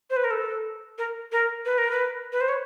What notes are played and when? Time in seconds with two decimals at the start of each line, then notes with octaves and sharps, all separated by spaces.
0.10 C5
0.16 B4
0.24 A#4
0.31 A4
0.98 A#4
1.32 A#4
1.65 B4
1.78 A#4
1.91 B4
2.32 B4
2.41 C5
2.49 C#5